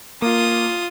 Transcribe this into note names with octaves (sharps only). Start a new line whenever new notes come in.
A#3 F4 D#6